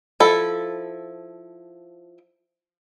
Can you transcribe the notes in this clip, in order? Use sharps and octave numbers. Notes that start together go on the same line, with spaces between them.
F3 E4 A4